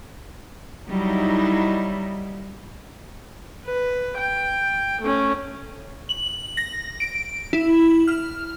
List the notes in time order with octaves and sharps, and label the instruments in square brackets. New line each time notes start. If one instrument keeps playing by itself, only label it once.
[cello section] F#3 D#4 E4 [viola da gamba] G3
[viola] B4
G5
A3 C#4
[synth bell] F#7
A#6
D7
E4
F6